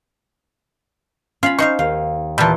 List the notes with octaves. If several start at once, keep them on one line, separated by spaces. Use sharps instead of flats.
C#4 F4 F5 B5
D#4 C5 F5 C#6
D#2 F5
A#2 E3 G3 A5